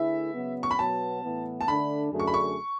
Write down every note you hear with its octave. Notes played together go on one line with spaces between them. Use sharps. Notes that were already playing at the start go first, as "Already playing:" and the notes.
Already playing: D3 A3 E4 G#4 B4 E5
C#3 F#3 B3
C#6
B5
B2 F#3 B3 A5
A2 E3 B3
A5
D3 A3 D4 B5
F#2 D3 A3 D4 G#4
C#6
B5
C#6